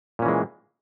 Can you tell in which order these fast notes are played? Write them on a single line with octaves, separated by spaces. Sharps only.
A#2 C#4 E3 G#3